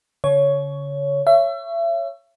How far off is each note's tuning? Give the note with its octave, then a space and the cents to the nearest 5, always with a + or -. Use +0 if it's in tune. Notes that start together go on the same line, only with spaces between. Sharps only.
D3 -45 C#5 +10
C#5 +0 E5 +35